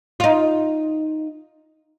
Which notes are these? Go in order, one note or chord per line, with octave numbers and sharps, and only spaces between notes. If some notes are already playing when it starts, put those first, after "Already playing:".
D#4 F4